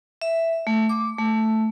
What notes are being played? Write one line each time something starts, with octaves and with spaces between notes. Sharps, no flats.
E5
A3
D6
A3